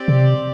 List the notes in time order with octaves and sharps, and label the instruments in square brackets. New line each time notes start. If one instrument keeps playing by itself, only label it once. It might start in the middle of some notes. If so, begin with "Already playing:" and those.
Already playing: [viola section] C4 G4 D5
[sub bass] C3